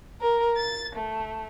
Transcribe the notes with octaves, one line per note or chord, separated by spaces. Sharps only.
A#4
A6
A3